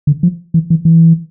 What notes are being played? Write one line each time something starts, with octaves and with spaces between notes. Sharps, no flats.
D3
F3
E3
E3
E3